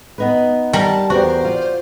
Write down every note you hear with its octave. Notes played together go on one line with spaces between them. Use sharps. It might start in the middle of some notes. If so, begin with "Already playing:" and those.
B3 D#4 B4
G3 A#4 A5
E2 F#4 G4 A#4 C5
F4 D5